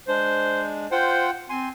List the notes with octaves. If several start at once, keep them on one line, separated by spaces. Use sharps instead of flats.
G#3 D4 C5
F4 C5 F#5 G5
C4 G#5 C6